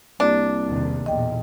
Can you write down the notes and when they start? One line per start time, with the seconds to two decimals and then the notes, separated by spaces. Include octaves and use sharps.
0.20 C2 A#3 D4 G4 D5
0.66 E2 C3 D#3
1.06 B1 E2 A#2 D#5 G5